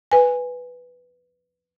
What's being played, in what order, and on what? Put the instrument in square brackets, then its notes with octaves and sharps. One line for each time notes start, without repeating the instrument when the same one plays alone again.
[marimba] B4 G#5